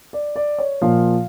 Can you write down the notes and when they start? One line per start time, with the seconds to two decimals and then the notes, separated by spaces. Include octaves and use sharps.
0.13 D5
0.36 D5
0.58 C#5
0.82 A#2 F3 F5